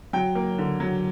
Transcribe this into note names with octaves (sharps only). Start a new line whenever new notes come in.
F#3 G5
A#3
D3
F#3